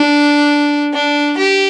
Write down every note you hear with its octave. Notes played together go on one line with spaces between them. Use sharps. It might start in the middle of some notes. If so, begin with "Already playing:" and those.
Already playing: D4
D4
G4